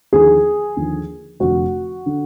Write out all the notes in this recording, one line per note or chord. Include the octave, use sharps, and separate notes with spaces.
D#2 D3 F3 G#4
D#2 D3 F3
F1 F2 D3 F#4
D3